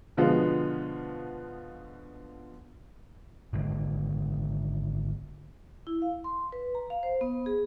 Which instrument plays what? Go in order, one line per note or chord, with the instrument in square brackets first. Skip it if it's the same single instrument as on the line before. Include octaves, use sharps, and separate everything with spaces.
[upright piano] B2 D3 F3 G#3 B3 F4
[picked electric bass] G#1 D3 G#3
[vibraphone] E4
F5
C6
B4
A#5
F5
C5
B3
G#4